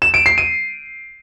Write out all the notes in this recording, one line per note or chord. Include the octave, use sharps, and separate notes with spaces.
E7
D7
C7
D#7